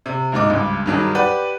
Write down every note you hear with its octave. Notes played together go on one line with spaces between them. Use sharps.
C3
D1 G#2 D#4 D6
C#2 G2
G2 D#3 F#3 G#4
G4 B4 D5 F#5